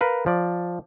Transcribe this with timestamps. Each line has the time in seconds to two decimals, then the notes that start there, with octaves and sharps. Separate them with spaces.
0.01 A#4 B4 F5
0.26 F3 D5